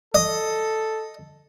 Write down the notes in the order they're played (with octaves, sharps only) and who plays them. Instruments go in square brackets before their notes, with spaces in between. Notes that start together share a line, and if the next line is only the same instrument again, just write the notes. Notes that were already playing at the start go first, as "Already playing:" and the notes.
[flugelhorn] A4 [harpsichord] D#5